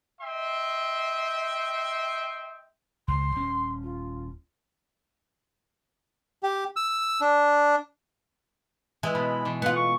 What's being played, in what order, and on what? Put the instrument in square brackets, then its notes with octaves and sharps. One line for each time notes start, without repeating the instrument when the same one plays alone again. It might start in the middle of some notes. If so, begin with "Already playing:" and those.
[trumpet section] D#5 E5 G5 C6
[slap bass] C#2 [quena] C6
[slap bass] D#1 C#4
[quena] F4
[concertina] G4
E6
D4
[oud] E3 [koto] G#3
[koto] B2 [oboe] B5
[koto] B2 E3
[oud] B3 F4 [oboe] F#5
[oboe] C#6